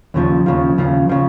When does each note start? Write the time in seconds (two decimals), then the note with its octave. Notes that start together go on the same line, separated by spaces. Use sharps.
0.14 D#2 C#3 F3
0.46 D#2 C#3 F3
0.78 D#2 C#3 F3
1.09 C#3 F3